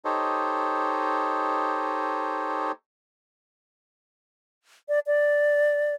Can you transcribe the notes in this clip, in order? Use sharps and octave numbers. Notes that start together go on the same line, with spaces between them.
D#4 G4 A4 C5 C#5 D#5
D5
D5